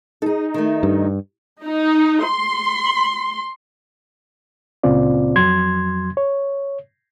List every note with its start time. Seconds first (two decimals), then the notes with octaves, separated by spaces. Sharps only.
0.22 D#4 G#4 A4
0.54 D#3 A3
0.83 G2
1.64 D#4
2.24 C6
4.83 C#2 A#2 C#3 C4 F4 D5
5.36 F2 F#3 C6 G#6
6.17 C#5